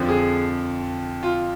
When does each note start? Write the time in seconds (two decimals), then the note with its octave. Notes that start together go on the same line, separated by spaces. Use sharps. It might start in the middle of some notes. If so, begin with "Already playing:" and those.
Already playing: F2 D3 F3
0.09 G#4
1.23 F4